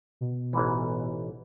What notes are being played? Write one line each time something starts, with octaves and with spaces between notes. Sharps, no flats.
B2
A1 G#2 E3